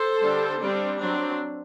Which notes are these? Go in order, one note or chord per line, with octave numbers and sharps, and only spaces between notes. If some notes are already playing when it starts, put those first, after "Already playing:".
Already playing: A4 C5
D3 G3 D4
G3 C4 D4
F#3 C4 D4